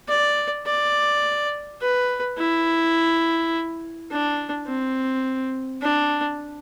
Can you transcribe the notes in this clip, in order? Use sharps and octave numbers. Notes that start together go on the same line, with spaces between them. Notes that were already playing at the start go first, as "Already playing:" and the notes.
D5
D5
B4
E4
D4
C4
D4